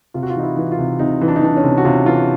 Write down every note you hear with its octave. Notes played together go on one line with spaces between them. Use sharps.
C3 F4
F#4
F4
E3 D#4
E4
E3
F4
C3
C3 D#4
E3
D4
D#4
E3 D4
C#4
C3
F#4
C3 F4
E3 F4